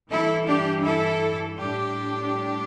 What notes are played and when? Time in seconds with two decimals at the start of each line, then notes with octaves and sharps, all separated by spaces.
0.11 G2 E3 G3 E4 A4
0.47 D4 G4
0.84 E4 A4
1.57 A2 G3 D4 G4